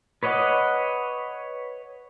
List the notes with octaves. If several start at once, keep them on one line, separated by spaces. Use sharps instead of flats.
B4 C#5 D#5 F#5 D6